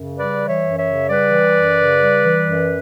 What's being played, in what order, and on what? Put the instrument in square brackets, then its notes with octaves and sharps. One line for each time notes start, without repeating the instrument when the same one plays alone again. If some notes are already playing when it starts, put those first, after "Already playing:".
Already playing: [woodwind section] F#2 C#3
G3 B4 D5
E3
C#5 E5
F#2
C#5 E5
C#3
G3 B4 D5
E3
F#2
C#3
G3
E3
F#2